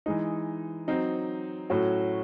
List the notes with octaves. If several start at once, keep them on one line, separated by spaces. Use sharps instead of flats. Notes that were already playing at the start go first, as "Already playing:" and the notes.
E3 G#3 D#4
F#3 C4 D#4
A2 F#3 C#4 F#4